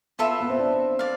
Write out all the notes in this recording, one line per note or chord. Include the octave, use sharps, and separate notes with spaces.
B3 F4 A4 E5 B5
B3
C4
D4
D5 F5